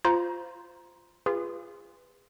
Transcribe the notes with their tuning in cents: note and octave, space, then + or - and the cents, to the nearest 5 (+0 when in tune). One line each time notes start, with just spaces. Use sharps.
F4 +0 C5 -15 A#5 +20
F4 -15 G#4 -35 B4 +5